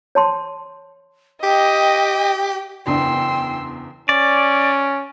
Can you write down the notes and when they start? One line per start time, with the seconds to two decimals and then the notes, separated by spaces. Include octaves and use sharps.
0.15 C#5 A5 C6
1.43 G4 D#5 G5
2.87 F#1 E2 D4 G5 C6 E6
4.09 C#4 D5